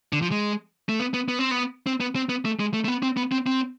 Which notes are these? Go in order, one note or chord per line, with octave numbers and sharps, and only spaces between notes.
D3
F3
G#3
A3
B3
B3
B3
C4
B3
C4
B3
C4
B3
A3
G#3
A3
A3
B3
C4
B3
C4
C4